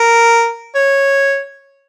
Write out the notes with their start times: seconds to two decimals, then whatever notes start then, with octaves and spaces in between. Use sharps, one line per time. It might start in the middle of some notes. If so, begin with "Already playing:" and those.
Already playing: A#4
0.75 C#5